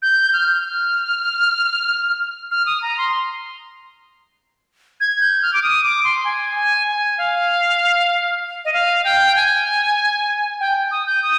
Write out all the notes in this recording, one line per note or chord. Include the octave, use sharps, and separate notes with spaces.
G6
F6
F6
F6
D#6
A#5
C6
G#6
G6
F6
D6
D#6
D6
C6
G#5
G#5
G#5
F5
D#5
F5
G5
G#5
G5
D#6
G6
D#6